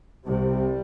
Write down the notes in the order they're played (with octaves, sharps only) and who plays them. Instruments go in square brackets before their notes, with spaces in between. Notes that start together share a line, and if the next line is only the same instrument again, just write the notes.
[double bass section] C2 C3 G3